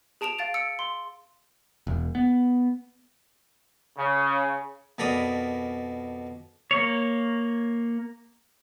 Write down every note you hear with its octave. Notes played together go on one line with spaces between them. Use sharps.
G#4 A5 D7 E7 F7
F5 A6 D7
E6 C#7 D7
C6
E1
B3
C#3
F2 B2 A#4 D5 B5 D#6
A#3 C#5